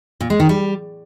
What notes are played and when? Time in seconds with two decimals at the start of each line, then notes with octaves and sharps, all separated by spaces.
0.21 A#2
0.30 G#3
0.40 D#3
0.49 G3